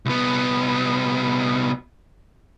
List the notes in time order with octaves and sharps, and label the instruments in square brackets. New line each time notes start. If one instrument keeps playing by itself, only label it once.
[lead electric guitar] C2 B3